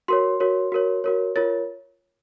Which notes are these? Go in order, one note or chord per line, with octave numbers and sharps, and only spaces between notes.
F#4 A#4 C#5 C6
F#4 A#4 C#5
F#4 A#4 C#5
F#4 A#4 C#5
F4 A#4 C#5 A6